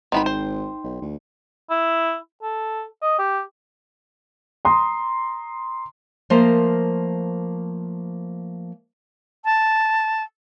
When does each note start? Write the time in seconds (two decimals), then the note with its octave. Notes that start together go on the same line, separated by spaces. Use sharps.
0.12 G#1 D#3 B3 D#4 G5 B5 C6
0.26 C5
0.84 B1
1.02 D2
1.70 E4
2.43 A4
3.02 D#5
3.19 G4
4.65 A#5 C6 D#6
6.30 F3 A3 A#3 A#4 C5
9.45 A5